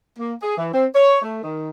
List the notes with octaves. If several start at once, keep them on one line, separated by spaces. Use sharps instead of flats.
A#3
G#4
E3
C4
C#5
A3
D#3